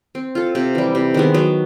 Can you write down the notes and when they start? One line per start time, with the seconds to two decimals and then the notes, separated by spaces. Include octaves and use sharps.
0.15 C4
0.35 F4 A4
0.55 C3
0.75 E3 G3
0.95 C3
1.14 D#3 G#3 B3
1.34 F#3